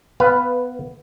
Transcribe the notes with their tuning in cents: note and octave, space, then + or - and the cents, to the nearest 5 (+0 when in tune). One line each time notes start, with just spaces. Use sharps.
B3 +15 B4 +5 F5 +0